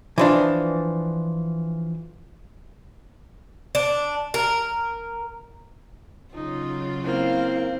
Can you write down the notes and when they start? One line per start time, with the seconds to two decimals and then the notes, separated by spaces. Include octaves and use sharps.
0.18 E3 F3 D4
3.75 D4
4.34 A#4
6.34 C#3 F#3 D#4 F4
7.05 A#3 C4 E4 F5